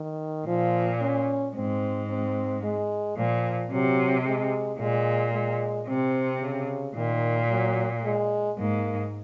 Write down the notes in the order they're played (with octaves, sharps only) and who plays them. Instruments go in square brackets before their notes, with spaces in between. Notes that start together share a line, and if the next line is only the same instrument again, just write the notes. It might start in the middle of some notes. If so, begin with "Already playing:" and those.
Already playing: [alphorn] D#3
[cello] A#2 [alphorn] F3
[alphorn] C#4
[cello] G#2 [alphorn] C4
[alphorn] C4
G#3
[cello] A#2 [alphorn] F3
[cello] C3 [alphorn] F#3
[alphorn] G#3
[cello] A#2 [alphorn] G#3
[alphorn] G#3
[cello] C3 [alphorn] C4
[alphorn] C#3
[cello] A#2 [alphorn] D#3
[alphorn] F#3
G#3
[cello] G#2 [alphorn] A#3